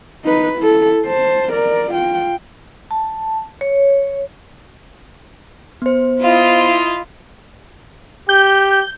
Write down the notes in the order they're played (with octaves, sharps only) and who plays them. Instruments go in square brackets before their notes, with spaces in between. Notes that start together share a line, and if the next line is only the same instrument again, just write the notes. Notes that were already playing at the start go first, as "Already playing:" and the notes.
[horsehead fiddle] D#4 B4
E4 A4
C5 A5
A#4 D5
F4 G5
[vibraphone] A5
C#5
[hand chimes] B3 C5
[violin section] E4 F4 D#5
[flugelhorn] G4 [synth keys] G6